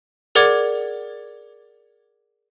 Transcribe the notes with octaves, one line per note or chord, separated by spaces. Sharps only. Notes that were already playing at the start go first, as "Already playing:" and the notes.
G#4 A#4 D5 F#5 D6 G#6